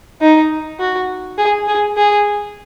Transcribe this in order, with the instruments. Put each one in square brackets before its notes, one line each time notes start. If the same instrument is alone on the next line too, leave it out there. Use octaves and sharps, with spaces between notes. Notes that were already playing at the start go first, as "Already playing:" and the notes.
[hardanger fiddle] D#4
F#4
G#4
G#4
G#4